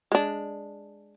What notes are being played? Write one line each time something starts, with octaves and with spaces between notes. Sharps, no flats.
G#3 D4